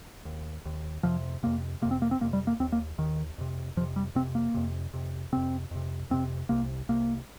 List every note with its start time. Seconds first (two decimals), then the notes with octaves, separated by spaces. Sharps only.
0.25 D#2
0.65 D#2
1.03 F2 C3 F3
1.43 F2 C3 A#3
1.82 C3 A#3
1.85 F2
1.91 C4
2.02 A#3
2.11 C4
2.21 F2 C3 A#3
2.33 G3
2.47 A#3
2.60 D#2 C4
2.72 A#3
2.98 D#2 D#3
3.38 F2 C3
3.77 F2 F3
3.80 C3
3.96 G3
4.15 F2 C3 C4
4.35 A#3
4.54 F2 C3
4.93 F2 C3
5.32 F2 C3 C4
5.71 F2 C3
6.10 F2 C3 C4
6.49 C2 C3 A#3
6.89 C2 C3 A#3